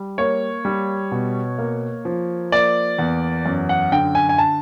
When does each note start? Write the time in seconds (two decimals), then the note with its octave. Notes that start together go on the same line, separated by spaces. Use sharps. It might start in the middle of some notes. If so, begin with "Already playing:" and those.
Already playing: G3
0.18 A#3 C#5
0.65 G3
1.11 B2
1.58 A#3
2.05 F3
2.52 A#3 D5
2.99 E2
3.46 F#2
3.69 F#5
3.92 D3 G5
4.15 G#5
4.29 G#5
4.38 A5